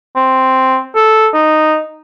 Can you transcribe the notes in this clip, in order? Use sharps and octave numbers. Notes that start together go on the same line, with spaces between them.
C4
A4
D#4